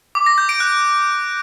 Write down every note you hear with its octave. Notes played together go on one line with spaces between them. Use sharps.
D6
A#6
G6
D7
F#6